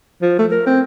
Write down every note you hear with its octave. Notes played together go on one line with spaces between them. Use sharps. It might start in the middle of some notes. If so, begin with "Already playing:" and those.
F3
A3
A#4
C4